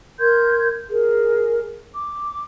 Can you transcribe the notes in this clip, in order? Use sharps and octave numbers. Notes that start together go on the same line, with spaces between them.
A#4 C6 G6 G#6
G#4 A#4
D6